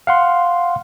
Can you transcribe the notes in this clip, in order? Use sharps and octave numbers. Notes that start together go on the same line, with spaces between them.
F5 F#5 C6